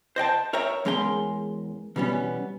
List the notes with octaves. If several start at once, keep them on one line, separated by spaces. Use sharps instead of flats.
C5 D#5 G5 A5
A#4 C#5 E5 G5 A#5
E2 G#3 C#4 A#4 G5 C6
B2 E3 G3 B3 C#4